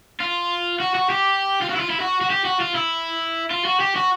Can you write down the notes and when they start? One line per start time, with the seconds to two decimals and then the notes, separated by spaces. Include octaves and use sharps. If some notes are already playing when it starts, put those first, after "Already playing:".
0.20 F4
0.80 F#4
0.95 F#4
1.10 G4
1.62 F4
1.70 F#4
1.76 E4
1.80 F4
1.90 E4
2.00 F#4
2.21 F#4
2.30 G4
2.45 F#4
2.60 F4
2.75 E4
3.50 F4
3.65 F#4
3.80 G4
3.96 F#4